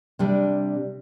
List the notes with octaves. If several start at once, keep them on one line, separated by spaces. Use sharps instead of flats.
C3 G3 D4